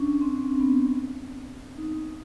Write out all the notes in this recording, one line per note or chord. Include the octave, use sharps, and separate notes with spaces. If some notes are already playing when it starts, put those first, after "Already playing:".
Already playing: C#4 D4
C4
C4
B3
D#4